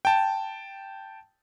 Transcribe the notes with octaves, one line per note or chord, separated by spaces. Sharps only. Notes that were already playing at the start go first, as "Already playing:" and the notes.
G5 A5